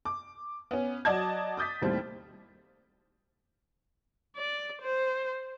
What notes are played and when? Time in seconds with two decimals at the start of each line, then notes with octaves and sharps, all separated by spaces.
0.05 D6
0.71 B3 C#4
1.05 F#3 F#4 D5 D#5 A5 G#6
1.57 D6 D#6 G6 A6 B6
1.82 D#2 A2 G3 C4
4.36 D5
4.82 C5